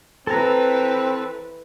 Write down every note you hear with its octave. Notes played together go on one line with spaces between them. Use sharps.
E3 C4 A4 B4 A#5